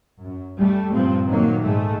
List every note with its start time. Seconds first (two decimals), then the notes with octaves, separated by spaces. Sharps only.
0.22 F#2
0.57 G3 A3
0.91 G2 A#2 F3 C4
1.27 A#2 D#3 F#3 A#3
1.63 G#2 G#3 A3